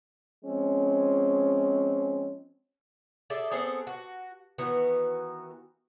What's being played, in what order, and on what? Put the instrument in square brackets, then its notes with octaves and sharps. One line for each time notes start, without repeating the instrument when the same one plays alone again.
[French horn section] F3 G#3 C4 C#4
[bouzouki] G#4 A4 D5 E5
B3 C4 G#4 A4
F#4
D#3 E3 B3 F#4